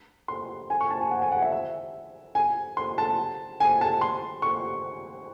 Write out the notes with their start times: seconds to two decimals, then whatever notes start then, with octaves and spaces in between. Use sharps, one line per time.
0.28 C6
0.70 G#5
0.81 C#6
0.90 A5
1.01 G#5
1.11 F#5
1.22 G#5
1.32 F#5
1.42 E5
1.52 E5
2.35 G#5
2.77 C6
2.98 A5
3.60 G#5
3.81 A5
4.01 C6
4.42 C#6